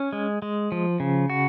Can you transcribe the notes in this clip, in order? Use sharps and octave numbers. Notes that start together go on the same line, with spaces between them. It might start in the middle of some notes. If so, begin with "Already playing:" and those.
Already playing: C#4
G#3
G#3
F3
C#3
F#4